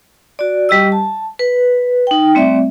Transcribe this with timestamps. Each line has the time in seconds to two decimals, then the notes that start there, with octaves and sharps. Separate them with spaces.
0.39 F#4 D5
0.69 G3 G4 D#5 E6
0.92 A5
1.39 B4
2.07 D#4 G5
2.34 G3 A3 C4 D5 E5